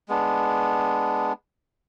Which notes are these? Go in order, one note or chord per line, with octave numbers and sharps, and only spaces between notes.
G#3 B3 D4